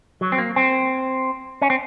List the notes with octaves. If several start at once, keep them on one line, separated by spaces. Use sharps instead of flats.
F#3
C4
A#3
C4
C#4
C4